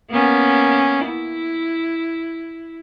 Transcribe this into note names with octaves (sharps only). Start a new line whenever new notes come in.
A#3 B3 C#4
E4